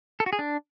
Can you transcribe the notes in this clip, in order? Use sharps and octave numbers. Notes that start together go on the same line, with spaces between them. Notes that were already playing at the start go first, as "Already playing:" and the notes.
A4
F#4
G#4
D4